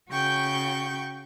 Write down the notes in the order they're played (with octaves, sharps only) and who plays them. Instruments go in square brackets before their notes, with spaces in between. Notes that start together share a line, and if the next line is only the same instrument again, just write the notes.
[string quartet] C#3 F#4 G5 C#6 G6